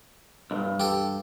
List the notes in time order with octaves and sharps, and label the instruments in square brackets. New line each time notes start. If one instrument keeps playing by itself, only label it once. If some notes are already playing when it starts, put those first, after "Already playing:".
[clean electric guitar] B1 G2
[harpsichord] G4 A4